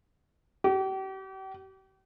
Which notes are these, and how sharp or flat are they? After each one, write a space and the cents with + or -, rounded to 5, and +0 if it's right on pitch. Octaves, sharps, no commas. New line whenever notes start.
G4 -40